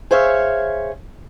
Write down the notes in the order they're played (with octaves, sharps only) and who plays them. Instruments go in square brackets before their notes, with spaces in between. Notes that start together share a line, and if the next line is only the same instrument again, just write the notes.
[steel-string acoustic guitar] G#4 C5 C#5 E5 F5